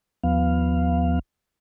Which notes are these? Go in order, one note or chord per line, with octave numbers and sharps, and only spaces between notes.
D#2 F3 B3 F5